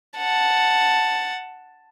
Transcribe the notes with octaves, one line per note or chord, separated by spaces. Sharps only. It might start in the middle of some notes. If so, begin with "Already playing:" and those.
F#5 A5